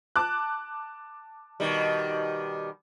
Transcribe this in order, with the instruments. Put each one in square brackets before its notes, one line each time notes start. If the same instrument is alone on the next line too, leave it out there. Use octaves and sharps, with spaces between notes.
[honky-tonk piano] A5 D6 F#6
[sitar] B2 D#3 G3